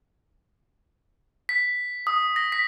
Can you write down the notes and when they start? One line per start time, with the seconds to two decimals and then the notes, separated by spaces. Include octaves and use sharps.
1.49 B6
2.07 D#6
2.36 A#6
2.52 B6